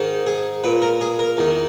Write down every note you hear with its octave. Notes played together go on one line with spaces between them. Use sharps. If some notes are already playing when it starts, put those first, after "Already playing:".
Already playing: G#2 D#3
G#4
A#2 B4
A#4
G#4
A#4
E2 D#3